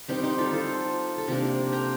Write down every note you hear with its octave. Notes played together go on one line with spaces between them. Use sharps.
G3 C4 D#4 G4 A#4
D#4 G4
F4 A4
F4 A4
A4
C3 F3 A#3 D4 G4 A#4
G5 A#5